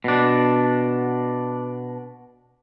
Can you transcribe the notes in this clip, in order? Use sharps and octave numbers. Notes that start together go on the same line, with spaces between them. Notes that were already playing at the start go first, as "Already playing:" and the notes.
B2 D4